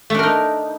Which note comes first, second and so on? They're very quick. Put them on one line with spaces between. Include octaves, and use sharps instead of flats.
A3 D4 A#4 D#4